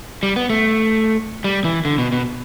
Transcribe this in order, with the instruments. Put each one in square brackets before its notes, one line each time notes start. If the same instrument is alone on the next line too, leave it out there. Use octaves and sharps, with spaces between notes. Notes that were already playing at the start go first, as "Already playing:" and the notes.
[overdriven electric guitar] G3
B3
A3
G3
E3
D3
B2
B2